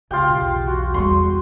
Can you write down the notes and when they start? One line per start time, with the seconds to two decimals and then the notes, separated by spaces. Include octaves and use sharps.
0.11 C#2 F4 G4 G5
0.28 B1 E2
0.67 F#4
0.94 E2 G3 C6 C#6 D#6